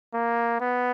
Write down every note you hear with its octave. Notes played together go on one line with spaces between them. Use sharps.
A#3
B3